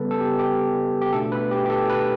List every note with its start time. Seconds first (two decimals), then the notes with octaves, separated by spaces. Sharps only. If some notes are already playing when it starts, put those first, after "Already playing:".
Already playing: C#3 G3 B3 A4 B4
0.11 A4
0.21 G4
0.39 G4
1.01 G4
1.12 B2 A3 D4 A4
1.32 B4
1.51 G4
1.66 G4
1.70 A4
1.89 B4